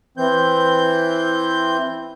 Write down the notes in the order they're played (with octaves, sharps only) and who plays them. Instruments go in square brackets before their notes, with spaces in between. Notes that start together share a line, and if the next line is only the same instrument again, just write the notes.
[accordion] E3 C4 G6